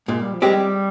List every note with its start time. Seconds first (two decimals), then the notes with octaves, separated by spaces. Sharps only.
0.08 A#2 G#3
0.21 G3
0.34 F3
0.42 G3 G#3 C4 G4